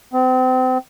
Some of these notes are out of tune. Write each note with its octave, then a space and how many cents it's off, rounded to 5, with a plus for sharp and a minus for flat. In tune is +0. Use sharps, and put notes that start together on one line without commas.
C4 -35